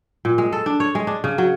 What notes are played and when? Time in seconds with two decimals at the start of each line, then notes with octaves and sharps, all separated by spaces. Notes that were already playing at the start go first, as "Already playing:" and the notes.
0.25 A#2
0.38 G#3
0.52 A4
0.66 D4
0.80 C#5
0.95 G#3
1.07 D4
1.24 C#3
1.38 F#3